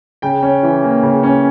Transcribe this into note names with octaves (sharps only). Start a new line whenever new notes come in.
C#3 G5
C#4
E3
A#3
C#3
C#4